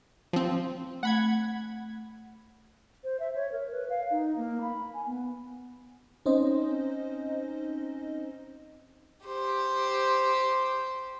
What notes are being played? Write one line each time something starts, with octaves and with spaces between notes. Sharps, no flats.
F3 C4
A3 F#5 B5 G#6
C5
E5
C#5
A#4
B4
F5
D#4
A#3
B5
G#5
B3
C4 C#4 D#4 C5 D#5
G4 C5